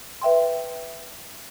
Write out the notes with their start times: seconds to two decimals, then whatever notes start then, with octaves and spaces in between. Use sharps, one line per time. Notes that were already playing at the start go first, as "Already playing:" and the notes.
0.22 B4 E5 G5 C6